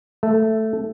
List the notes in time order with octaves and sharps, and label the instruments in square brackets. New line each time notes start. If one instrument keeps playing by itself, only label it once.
[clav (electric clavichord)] A3